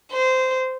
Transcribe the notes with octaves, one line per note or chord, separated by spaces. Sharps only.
C5